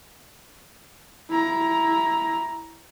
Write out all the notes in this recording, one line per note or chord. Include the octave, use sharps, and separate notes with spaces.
E4 A#5